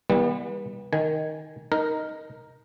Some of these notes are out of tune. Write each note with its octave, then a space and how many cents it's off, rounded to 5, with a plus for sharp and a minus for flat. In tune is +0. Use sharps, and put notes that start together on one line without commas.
E3 -30 G3 +20 B3 -30
D#3 +0 G#5 +0
D#4 +0 A#4 +0